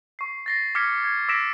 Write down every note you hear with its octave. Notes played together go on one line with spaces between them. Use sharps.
C#6 C7
A6 A#6 C7
D6 F6 G#6 B6 C#7
G#6
D6 E6 A#6 B6 D7 E7